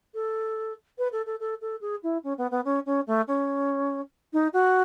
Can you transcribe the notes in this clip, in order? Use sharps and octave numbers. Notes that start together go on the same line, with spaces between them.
A4
B4
A4
A4
A4
A4
G#4
E4
C#4
B3
B3
C#4
C#4
A3
C#4
D#4
F#4